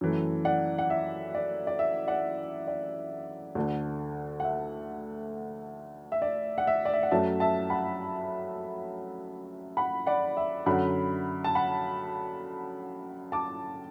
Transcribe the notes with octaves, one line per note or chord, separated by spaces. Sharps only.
F#2 E3 A3
D5 F#5
F#5
E5
D5
D5
E5
D5 F#5
D5
D2 D3 A3
F#5
E5
E5
D5
F#5
E5
D5
E5
F#5
F#2 F#3 A3 E5 A5
E5 A5
F#5 B5
F#5 B5
D5 F#5
E5
F#2 D3 F#3 F#5 B5
A5
F#5 B5
A5 D6